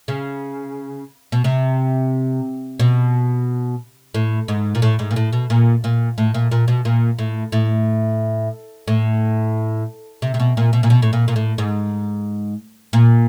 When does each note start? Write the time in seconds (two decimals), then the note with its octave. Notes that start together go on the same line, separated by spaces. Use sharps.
0.08 C#3
1.32 B2
1.44 C3
2.80 B2
4.14 A2
4.48 G#2
4.75 A#2
4.82 A2
4.99 G#2
5.11 A#2
5.16 A2
5.33 B2
5.50 A#2
5.84 A#2
6.18 A2
6.34 A#2
6.51 A#2
6.68 B2
6.85 A#2
7.19 A2
7.52 A2
8.88 A2
10.22 C3
10.34 C3
10.40 B2
10.57 A#2
10.73 B2
10.83 A#2
10.90 B2
11.02 A2
11.13 A#2
11.28 A#2
11.36 A2
11.58 G#2
12.93 A#2